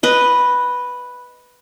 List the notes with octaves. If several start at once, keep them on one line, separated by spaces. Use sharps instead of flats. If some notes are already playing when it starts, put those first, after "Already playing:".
B4 D#5